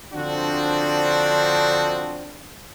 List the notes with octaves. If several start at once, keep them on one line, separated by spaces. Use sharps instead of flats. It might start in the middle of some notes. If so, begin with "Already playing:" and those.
D3 F3 C4 D4 F#4